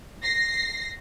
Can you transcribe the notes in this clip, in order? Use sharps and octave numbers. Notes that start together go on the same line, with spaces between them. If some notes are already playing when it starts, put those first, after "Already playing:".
A#6 C7